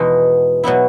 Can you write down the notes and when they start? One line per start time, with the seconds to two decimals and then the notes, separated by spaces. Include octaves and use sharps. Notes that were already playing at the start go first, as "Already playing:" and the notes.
Already playing: E2 B2 G#3 D#4
0.64 B2 F#3 B3 E4